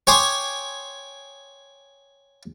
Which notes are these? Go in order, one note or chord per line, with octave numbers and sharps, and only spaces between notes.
C#5 G5 G#5 C6 D6 D#6